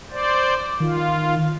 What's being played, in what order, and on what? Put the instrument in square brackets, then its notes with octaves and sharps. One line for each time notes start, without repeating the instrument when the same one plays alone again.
[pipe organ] C5 D5
[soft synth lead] D#3 [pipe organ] F4